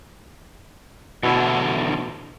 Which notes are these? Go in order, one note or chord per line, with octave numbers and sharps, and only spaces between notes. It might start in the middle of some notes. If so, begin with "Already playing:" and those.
E2 B2 D3 E4